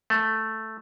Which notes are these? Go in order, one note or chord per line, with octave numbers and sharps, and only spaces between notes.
A3